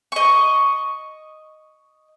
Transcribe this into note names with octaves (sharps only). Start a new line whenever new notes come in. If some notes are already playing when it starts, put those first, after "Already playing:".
D#5 C#6